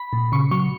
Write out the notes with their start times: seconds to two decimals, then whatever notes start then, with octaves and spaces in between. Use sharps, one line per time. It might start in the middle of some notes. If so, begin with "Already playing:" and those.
Already playing: B5
0.13 A#2
0.32 C#3 C#6
0.51 F#3 C#6